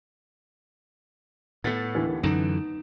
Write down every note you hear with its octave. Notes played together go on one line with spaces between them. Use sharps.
A2 A3 B3 A6 B6 C#7
D#2 D3 E3
F#2 D3 E3 D#4 D7 E7